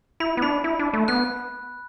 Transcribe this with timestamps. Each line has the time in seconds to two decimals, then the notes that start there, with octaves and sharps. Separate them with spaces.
0.20 E4 B5
0.37 B3
0.42 D4 B5
0.64 E4
0.79 D4
0.94 A3
1.08 B3 F#6